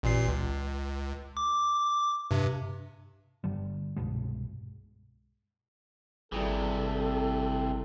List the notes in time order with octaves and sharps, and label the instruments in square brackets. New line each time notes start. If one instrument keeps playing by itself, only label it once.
[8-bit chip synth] A1 A#2 C7
C#2
D6
G2 C3
[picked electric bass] G2 D3 G3
C2 G2 B2 G#3
[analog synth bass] G#1 [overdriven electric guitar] C3 E3 [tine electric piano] G3 E4 G#4 [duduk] A4